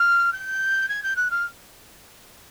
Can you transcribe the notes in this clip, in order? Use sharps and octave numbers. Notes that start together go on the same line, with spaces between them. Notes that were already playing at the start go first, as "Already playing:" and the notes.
Already playing: F6
G6
G#6
G6
F#6
F6